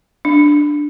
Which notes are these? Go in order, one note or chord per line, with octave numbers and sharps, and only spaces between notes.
D4